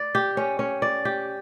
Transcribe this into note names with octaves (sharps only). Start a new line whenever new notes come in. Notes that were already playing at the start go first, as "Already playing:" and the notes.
Already playing: D5
G4
C#4
C#4
D5
G4